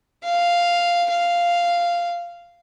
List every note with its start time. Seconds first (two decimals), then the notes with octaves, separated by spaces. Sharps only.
0.24 F5
1.10 F5